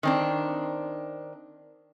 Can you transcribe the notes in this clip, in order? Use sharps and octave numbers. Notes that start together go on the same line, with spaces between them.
D#3 C4 D4